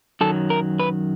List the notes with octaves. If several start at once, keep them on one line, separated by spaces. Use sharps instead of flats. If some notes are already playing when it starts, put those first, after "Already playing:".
F#2 D#3 F#3 A4
A#4
B4